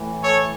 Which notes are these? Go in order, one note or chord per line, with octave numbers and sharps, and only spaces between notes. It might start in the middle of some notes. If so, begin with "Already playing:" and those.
Already playing: A2 E3
A4 C#5